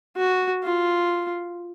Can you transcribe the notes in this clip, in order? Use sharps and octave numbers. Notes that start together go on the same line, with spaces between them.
F#4
F4